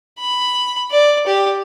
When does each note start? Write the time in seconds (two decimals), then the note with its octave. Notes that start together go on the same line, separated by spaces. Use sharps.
0.20 B5
0.91 D5
1.27 G4